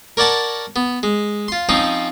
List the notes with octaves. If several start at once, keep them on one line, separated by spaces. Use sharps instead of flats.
A#4 C#5 D5 F#5 A5
B3
G#3
F4 C6
F3 C4 C#4 D#4